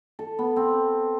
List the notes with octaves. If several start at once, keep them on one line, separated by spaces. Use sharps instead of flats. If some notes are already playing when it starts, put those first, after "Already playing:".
A4
B3
C4